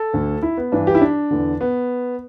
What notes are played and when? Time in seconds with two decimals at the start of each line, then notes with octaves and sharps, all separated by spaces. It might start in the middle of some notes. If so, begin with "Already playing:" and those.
Already playing: A4
0.13 D2 D3
0.43 E4
0.57 B3
0.72 G2 E3 D4
0.87 G4
0.95 E4
1.01 D4
1.31 E2 D3
1.61 B3